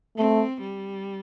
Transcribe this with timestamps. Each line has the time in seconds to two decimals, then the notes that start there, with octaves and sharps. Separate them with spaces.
0.17 A3 C4
0.61 G3